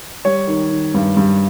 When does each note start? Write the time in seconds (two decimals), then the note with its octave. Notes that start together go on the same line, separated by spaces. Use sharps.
0.25 G3 C#5
0.47 D#3
0.71 D#3
0.94 G2
1.17 G2